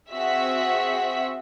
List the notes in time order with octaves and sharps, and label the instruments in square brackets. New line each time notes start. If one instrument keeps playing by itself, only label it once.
[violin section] C4 F#4 G#4 E5 F#5 B6